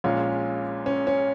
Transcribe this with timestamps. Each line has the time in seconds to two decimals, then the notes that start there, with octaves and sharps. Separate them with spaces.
0.04 A#1 A#2 G#3 C#4 F4
0.86 C#4
1.07 C#4